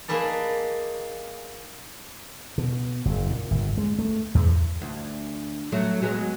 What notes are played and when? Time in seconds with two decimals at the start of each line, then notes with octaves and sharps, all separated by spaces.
0.08 A#3 D#4 G#4 B4 D5 A5
2.58 B2
3.05 F#1
3.30 A#2
3.51 G1
3.78 G#3
3.99 A3
4.35 E2
4.82 D2
5.72 F#3 A3
6.02 F#3 G#3 B3